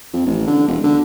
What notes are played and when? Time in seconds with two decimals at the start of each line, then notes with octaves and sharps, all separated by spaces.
0.13 F2
0.27 A1
0.47 D3
0.68 E1
0.84 D3